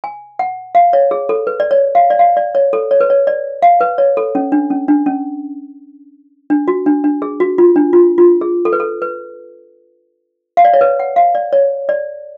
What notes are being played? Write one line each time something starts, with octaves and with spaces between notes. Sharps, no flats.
G#5
F#5
F5
C#5
G#4
A4
B4
D5
C#5
F5
D5
F5
D5
C#5
A4
C#5
B4
C#5
D5
F5
B4
C#5
A4
C#4
D4
C#4
D4
C#4
D4
F#4
D4
D4
G#4
F#4
F4
D4
F4
F4
G#4
A4
B4
A4
B4
F5
D5
C#5
B4
F#5
F5
D5
C#5
D5